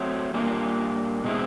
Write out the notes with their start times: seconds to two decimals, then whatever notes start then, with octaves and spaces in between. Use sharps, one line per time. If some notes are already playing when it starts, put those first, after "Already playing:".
Already playing: F#3 A3 C4
0.34 A#2 G3 A#3 D4 F4
1.24 B2 G#3 C4 E4